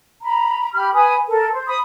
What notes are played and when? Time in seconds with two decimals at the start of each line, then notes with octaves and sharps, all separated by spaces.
0.22 A#5 B5
0.73 G4 B5 F6
0.93 B4 G#5 B5 D#6
1.27 A4 A#4
1.51 C5
1.66 B5 D#6